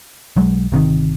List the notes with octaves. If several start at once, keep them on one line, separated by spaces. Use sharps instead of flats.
B1 F#3 G#3
G1 C3 D#3